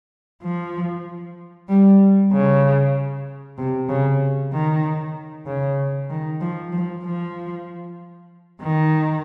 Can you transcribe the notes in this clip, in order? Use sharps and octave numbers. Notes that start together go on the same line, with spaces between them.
F3
G3
C#3
C3
C#3
D#3
C#3
D#3
F3
F3
F3
D#3